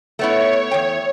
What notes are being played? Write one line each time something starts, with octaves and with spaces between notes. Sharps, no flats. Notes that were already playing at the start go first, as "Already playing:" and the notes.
A3 B3 E4 C#5
E2 G5